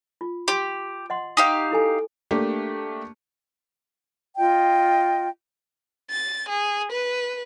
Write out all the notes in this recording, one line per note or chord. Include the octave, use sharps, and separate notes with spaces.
F4
G4 C6 D6
D#5 F#5 C6
D#4 G4 F5
E4 A4 G#5
A3 A#3 D4 G4
F4 D#5 G5
A6
G#4
B4